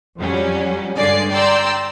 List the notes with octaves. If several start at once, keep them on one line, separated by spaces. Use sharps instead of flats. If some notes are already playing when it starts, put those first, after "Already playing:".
F2 F#3 G3 C#4
G2 D3 G#3 D5 G#5 C7
D5 G5 A#5 C6 E6